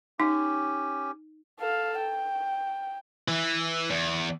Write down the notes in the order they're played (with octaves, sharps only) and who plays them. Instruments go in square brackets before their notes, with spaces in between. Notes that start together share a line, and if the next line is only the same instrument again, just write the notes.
[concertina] C#4 G4 [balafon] D#4
[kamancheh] A4 F5
G5
[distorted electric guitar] E3
E2